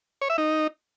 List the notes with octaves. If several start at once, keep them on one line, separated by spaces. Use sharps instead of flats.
C#5
E5
D#4